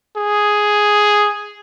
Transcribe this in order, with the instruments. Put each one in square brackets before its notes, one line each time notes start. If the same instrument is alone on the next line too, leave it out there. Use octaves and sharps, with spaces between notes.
[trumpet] G#4